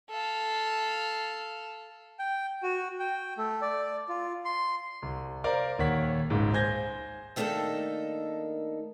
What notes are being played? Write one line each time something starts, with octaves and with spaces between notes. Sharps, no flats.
A4 F5
G5
F#4
G5
A3
D5
F4
C6
C2
A#4 C5 D5 F5 A#5
D#1 D#2 C#5 F#5 B6
D#1 G#1 C#2 G#2
C5 G#5 G6 G#6 A#6
D#3 A3 A#3 D4 D#4 A4